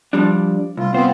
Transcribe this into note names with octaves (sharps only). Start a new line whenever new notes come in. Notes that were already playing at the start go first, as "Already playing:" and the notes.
F3 G3 D4
C2 F4
C2 B3 C4 F4 C5